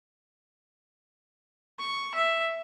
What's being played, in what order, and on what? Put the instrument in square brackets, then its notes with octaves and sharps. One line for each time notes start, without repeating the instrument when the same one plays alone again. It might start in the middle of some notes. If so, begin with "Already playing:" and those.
[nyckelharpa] C#6
E5